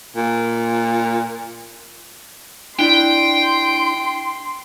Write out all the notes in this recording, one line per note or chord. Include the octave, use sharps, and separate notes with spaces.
A#2
D4 E4 D5 G5 C6